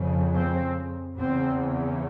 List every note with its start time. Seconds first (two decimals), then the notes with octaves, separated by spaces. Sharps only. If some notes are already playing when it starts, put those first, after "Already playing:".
Already playing: F2 C#3
0.35 C4
1.18 E2 C#3 C4